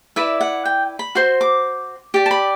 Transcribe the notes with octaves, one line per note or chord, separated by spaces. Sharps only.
E4 B4 D5 E5
F#5
G5
B5
F#4 C5 C6
D6
G4 D5
A5
B5